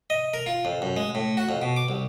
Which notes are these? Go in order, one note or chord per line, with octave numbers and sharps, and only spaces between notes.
D#5
A#4
F4
F2
F#2
G#3
A2
F#4
F2
B2
D6
C2